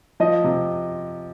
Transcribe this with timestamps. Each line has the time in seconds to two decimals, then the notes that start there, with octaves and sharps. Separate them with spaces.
0.20 F3 D#5
0.44 C3